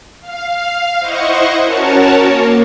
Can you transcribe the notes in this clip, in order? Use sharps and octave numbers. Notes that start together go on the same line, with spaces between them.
F5
E4 C5 D#5 F#5 C#6
C#4 F#4 A#4 C#5 A5
A#3